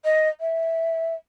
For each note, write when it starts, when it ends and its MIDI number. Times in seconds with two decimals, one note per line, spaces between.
0.04 0.29 75
0.40 1.14 76